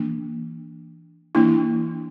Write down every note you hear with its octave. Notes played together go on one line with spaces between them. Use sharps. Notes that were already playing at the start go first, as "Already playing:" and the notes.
Already playing: E3 A#3 D4
E3 A#3 D4 E4